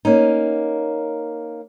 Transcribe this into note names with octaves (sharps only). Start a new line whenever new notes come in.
A#3 C#4 D#4